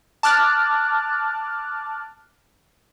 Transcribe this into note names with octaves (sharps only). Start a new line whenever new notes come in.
A5 D6 F6 F#6 A6